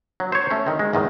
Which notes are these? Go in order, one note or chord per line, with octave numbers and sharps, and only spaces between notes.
F#3
C5 C#5
A3 C#4
D#3 C4
G#3
E2 G#2 D#3